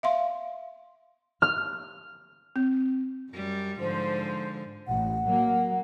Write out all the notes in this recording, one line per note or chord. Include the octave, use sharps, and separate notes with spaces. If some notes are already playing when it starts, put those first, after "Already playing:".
E5 F5 C6
F6
C4
F#2 G3
G#2 D3 F3 C5
A1 F#5
F#3 A#3